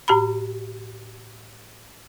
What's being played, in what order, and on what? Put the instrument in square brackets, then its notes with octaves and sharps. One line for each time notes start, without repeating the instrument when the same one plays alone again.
[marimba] A2 G4 A#5 B5